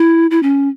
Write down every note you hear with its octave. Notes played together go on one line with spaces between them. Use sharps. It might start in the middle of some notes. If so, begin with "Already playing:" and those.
Already playing: E4
E4
C#4